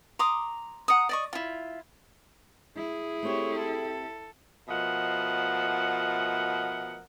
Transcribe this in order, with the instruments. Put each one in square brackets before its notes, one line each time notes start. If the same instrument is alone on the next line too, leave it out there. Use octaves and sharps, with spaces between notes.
[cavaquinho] A#5 C6 D6 D#6
F#5 A#5 D#6
D5 D#5 C#6
E4 F4
[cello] E4 [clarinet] G#4
[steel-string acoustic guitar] A3 C4 G4 [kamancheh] C#5 C6
[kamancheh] A4
[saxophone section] B2 F3 A3 A#4 D#5 F#5